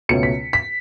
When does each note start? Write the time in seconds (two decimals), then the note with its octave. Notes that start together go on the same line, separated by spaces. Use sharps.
0.09 C#2 B2 A3 C#4 C#7
0.23 B6
0.53 B6